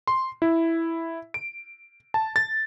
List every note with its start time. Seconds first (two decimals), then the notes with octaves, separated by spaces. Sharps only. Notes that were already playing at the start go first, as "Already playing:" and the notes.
0.07 C6
0.42 E4
1.34 D7
2.14 A5
2.36 A6